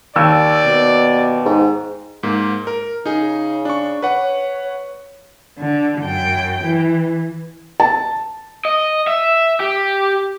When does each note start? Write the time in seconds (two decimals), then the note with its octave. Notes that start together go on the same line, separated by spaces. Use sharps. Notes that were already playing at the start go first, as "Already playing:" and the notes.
0.16 D#2 D5 E6
0.65 B2
1.46 G#2
2.23 G#2 A#3
2.67 A#4
3.06 C#3 D#4 G#4
3.65 D4 C#6
4.02 B4 C#5 F#5
5.58 D3
6.02 F#2 G5
6.64 E3
7.80 A5
8.65 D#5
9.07 E5
9.60 G4